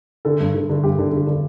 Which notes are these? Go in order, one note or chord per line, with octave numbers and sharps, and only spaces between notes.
D3 A4
G2
D3
D3
G2 G4
D3
D3
D3